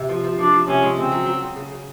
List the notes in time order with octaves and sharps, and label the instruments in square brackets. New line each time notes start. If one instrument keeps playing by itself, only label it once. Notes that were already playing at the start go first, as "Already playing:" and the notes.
Already playing: [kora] C3
F3
F3
[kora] F3 [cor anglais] D4
[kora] F3
[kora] C3 [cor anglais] C#4
[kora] G#3
[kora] C#3 [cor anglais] C4
[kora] F#3
F#3
C#3
C#3
C#3